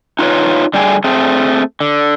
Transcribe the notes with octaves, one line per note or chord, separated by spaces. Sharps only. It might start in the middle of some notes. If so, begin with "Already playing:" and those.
D#4 F4 B4 C#5
D3 G3 G4 G#4
A3 C4 G#4
D3